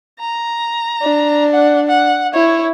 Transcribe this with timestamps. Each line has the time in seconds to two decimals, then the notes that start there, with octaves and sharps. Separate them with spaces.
0.20 A#5
1.03 D4
1.52 F#5
1.88 F#5
2.34 E4 C#5